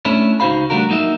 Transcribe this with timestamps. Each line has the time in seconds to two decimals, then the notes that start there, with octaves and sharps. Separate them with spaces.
0.05 A3 C#4 D4 E4
0.40 C#2 D#4 F#4 C5 F5 B5
0.70 G3 A3 D4 F#4 A#4
0.89 F#3 A#3 D#4 A#4 E5